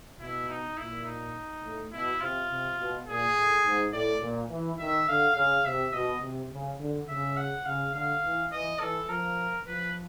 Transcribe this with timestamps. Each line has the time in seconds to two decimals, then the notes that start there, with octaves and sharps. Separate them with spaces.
0.20 B2 E4
0.48 D#4
0.77 A#2 E4
1.06 D#4
1.64 A2
1.92 B2 E4
2.21 C3 F4
2.50 C3
2.78 B2
3.06 A#2 G#4
3.35 A2
3.65 G#2
3.93 A2 D5
4.22 A#2
4.50 E3
4.79 D#3 E5
5.08 D3 F5
5.36 C#3 F5
5.65 C3 E5
5.93 B2 D#5
6.22 C3
6.51 C#3
6.80 D3
7.08 C#3 E5
7.37 F#5
7.66 C#3 F5
7.94 D3 F5
8.24 E3
8.52 E3 D#5
8.80 E3 A4
9.09 F3 A#4
9.67 F3 B4